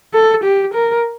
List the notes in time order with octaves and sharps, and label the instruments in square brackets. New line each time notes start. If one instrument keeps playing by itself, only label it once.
[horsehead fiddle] A4
G4
A#4